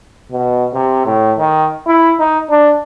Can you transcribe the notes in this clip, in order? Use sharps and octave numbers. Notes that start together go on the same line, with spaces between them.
B2
C3
A2
D#3
E4
D#4
D4